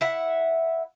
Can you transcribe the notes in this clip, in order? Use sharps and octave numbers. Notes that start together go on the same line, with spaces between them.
E4 E5 F#5